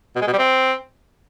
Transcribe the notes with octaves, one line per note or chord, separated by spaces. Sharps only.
B2
G#3
B2
G3
C4